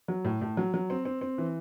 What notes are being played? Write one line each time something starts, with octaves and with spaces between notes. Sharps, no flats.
F#3
A2
A2
F#3
F#3
C4
C4
C4
E3